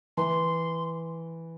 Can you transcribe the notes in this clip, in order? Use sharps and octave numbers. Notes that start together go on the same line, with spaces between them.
E3 C6